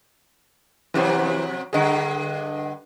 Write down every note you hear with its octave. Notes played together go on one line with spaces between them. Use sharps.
F2 C3 E3 F#3 G4 C5
G2 D3 G#4 D#5 F#5